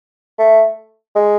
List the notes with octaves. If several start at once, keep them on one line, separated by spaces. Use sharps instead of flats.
A3
G#3